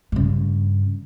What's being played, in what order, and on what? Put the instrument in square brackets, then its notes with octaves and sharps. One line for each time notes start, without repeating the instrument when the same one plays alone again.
[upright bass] G2 C#3